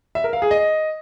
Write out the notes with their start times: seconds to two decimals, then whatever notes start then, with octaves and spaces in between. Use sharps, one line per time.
0.15 E5
0.24 A#4
0.33 F5
0.42 G#4
0.51 D#5